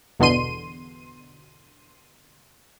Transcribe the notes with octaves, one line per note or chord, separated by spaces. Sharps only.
G1 E2 B2 D3 C6 D#7